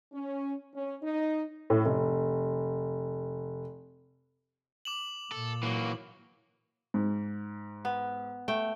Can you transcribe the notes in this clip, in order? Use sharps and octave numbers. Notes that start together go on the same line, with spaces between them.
C#4
C#4
D#4
A2
F1
D6 E7 F#7
A#2 A4
E3 F#3 A#3
G#2
B3
A3 G5